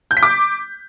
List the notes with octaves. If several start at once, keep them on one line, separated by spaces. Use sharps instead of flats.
G6
B6
D6